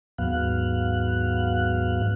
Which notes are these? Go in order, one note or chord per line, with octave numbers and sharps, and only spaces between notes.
D#2 G#2 F#3 B3 F5 F#6